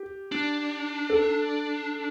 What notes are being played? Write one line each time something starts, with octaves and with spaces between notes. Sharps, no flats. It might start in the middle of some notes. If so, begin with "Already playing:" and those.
Already playing: G4
D4
A4